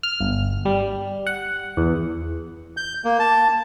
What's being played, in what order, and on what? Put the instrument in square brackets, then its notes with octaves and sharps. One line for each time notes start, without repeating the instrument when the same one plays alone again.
[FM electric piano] F6
G1
G3
F#5
E2
[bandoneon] G6
A#3
A5